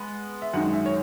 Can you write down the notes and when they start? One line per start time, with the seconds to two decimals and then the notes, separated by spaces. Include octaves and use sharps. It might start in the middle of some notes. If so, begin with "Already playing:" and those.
Already playing: G#3 B3
0.42 E5
0.53 F#2 D#3 G#3 D#4 F#5
0.73 E5
0.86 C#5